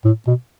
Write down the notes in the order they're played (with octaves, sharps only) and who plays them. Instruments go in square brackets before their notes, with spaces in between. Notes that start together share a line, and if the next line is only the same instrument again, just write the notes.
[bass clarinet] A2
B2